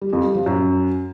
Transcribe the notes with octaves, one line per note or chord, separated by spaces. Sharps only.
G3
F2
G3
F3
F#2